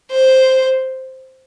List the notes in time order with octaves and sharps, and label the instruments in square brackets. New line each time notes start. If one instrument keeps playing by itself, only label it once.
[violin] C5